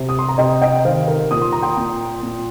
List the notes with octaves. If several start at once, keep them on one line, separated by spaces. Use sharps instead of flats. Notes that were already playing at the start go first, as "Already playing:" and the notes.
Already playing: C3
D#6
C6
A#5
C3 D#5 G5
D#5 G5
D#3 C5 F5
A#4
A#2 D#6
C6
A#5
G5 C6
A#2
A#2